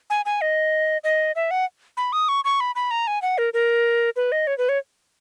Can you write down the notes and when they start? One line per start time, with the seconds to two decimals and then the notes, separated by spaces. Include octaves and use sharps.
0.10 G#5
0.26 G#5
0.41 D#5
1.04 D#5
1.36 E5
1.51 F#5
1.97 B5
2.13 D#6
2.29 C#6
2.45 C#6
2.60 B5
2.75 B5
2.91 A#5
3.07 G#5
3.22 F#5
3.38 A#4
3.54 A#4
4.16 B4
4.32 D#5
4.47 C#5
4.58 B4
4.69 C#5